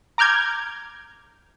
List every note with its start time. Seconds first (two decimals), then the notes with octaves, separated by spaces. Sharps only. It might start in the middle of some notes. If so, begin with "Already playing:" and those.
0.18 A#5 D6 F6 G6 G#6